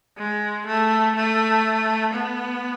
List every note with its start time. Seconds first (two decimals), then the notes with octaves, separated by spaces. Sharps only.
0.18 G#3
0.66 A3
1.16 A3
2.14 B3